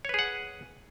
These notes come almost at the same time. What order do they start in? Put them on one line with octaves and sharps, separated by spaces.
C#5 B4 G#4 F#5